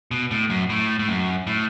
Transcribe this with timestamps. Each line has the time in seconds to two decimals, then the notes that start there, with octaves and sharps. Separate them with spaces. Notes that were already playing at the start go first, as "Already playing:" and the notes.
0.11 B2
0.31 A2
0.50 F#2
0.70 A2
0.99 A2
1.08 F#2
1.47 A2